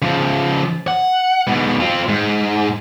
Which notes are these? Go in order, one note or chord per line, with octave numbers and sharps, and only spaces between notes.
C#3 F3
F#5
G#2 B2
C4 F4
G#2